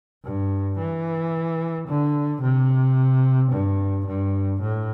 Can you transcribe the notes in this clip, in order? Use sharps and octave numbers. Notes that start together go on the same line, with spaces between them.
G2
E3
D3
C3
G2
G2
A2